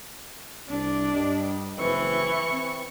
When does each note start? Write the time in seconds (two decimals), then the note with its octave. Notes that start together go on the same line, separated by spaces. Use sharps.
0.68 C2 D4
1.13 G2 G3 D#5
1.79 F#1 E3 C4 B4 C#6
2.52 C4